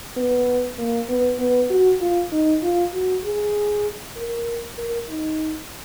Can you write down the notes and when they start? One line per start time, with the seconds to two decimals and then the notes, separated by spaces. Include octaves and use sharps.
0.16 B3
0.78 A#3
1.09 B3
1.39 B3
1.70 F#4
2.01 F4
2.32 D#4
2.63 F4
2.93 F#4
3.24 G#4
4.16 A#4
4.77 A#4
5.09 D#4